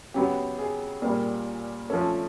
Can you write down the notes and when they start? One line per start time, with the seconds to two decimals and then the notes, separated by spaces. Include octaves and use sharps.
0.14 C#3 F#3 B3 G4
0.59 G#4
1.02 A#2 G3 A#3
1.90 F3 A3 C#4 A4